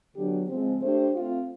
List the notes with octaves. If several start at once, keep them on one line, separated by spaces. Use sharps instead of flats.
D3 F#3 B3 D4 G4
C#3 F3 G#3 C4
A3 D4 G4 C5
A3 C4 F4